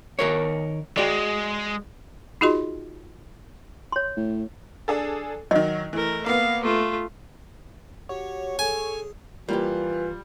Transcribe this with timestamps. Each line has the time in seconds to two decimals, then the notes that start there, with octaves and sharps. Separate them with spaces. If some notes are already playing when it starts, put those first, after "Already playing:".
0.19 D#3 A#4 C#5
0.97 G#3 F#4 D5
2.41 D#4 F4 F#4 G#4 D#5 C6
3.92 C#5 C6
4.17 A2
4.88 D4 G#4 A4
5.51 D#3 F#3 D#5
5.93 E3 A3 A#4
6.26 A#3 B3 F5
6.63 A3 F4
8.09 F#4 G4 C#5 F#5
8.59 G#4 A4 G#5
9.49 E3 G3 A#3 E4 F4 G4